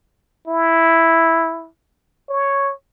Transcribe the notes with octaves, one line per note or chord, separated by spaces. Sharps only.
E4
C#5